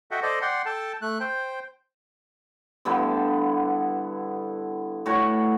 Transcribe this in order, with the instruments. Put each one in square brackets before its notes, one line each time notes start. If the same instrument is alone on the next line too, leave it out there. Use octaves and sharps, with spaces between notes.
[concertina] F#4 A4 D#5 E5 F#5 G5
A4 C5 D5 D#5
D5 F#5 G5 C6
A4 G5 A5
A3 F#6
C5 G5
[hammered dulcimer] G2 D3 B3 E4
A2 F#4 C#5 C#6